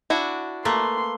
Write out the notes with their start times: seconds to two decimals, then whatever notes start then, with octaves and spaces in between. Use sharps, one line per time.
0.10 D4 E4 F#4
0.65 A3 A#3 B4 C6